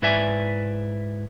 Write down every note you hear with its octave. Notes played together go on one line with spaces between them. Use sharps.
G#2 E4 B4 D5 E5 G#5